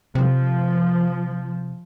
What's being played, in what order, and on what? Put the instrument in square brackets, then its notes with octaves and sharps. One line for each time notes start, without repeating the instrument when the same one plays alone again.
[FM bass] C3 [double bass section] F3